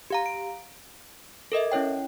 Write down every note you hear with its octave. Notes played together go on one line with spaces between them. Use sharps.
G4 F5 A#5
D7
A4 A#4 D#5 E5
C#4 E4 C#5 G5